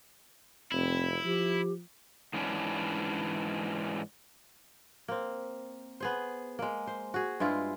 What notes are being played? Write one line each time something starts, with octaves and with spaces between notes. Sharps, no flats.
F1 C4 E4
F3 G4
G#2 E3 C#4 D4
A#3 C4
B3 G#4 C5
G#3 A#3
C5
F#4 G#4
G2 G#3 E4 F4